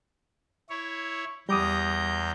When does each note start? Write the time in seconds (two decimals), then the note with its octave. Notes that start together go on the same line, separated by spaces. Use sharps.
0.70 E4 C#5
1.49 E2 G3 A#5 D6 D#6 G6